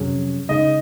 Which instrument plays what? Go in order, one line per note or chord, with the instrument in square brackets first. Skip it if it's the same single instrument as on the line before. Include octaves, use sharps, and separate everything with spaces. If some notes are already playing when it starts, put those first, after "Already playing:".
Already playing: [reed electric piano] F2 C3 F#3 C#4 G#4
[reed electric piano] C#3 G#3 D#4 G#4 [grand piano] D#5